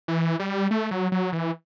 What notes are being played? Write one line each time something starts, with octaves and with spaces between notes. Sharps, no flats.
E3
G3
A3
F#3
F#3
E3